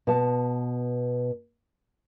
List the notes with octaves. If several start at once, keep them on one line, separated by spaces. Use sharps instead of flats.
B2 A5